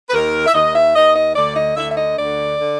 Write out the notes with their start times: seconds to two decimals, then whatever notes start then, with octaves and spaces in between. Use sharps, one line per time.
0.08 B4
0.13 D#2 D#3 A#4
0.47 E5
0.54 D#2 D#3 D#5
0.75 E5
0.95 D#2 D#3 D#5
1.15 D#5
1.36 D2 D3 D5
1.56 D#5
1.76 D2 D3 E5
1.91 E5
1.97 D#5
2.17 D2 D3 D5
2.58 D3